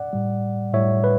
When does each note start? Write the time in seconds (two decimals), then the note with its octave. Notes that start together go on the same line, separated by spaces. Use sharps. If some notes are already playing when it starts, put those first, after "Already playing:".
Already playing: D5 F#5
0.13 A2 G3
0.74 A2 G3 C#5 E5
1.04 B4